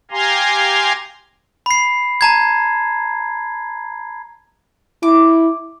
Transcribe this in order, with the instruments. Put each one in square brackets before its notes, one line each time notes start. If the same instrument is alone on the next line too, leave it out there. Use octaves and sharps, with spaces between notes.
[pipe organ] G4 F5 G#5 A#5 C6
[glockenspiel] B5 C7
A5 A#5 G#6
[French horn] E4 [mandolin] D6